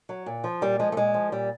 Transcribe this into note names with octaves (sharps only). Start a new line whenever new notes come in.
F#3
A#2
F3
A#2 G3
F3 G#3
A3
A#2 G#3
F3
A#2 G3